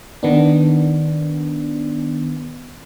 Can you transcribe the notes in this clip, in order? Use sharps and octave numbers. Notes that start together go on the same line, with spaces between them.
D#3 B3 D4